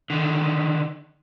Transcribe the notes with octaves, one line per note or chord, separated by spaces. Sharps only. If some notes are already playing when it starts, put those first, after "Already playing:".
D3 D#3